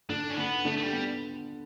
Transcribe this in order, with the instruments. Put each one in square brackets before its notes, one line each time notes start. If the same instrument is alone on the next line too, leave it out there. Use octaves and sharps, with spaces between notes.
[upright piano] D3 [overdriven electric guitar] D4
[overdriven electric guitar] C#4
[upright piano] D3 [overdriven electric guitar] B3
[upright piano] D3 [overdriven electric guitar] A3
[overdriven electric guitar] A3
G3
[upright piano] B3